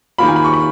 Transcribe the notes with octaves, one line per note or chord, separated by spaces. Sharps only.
D#3 A#3 F4 B5
G#5
B5
C#6
B5